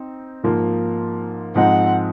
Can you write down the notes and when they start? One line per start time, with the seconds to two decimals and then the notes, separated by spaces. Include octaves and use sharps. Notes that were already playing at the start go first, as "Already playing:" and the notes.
Already playing: C4 D#4
0.44 G#2 F3 A#3
1.55 G#2 F3 G#3 C4 D#4 F#5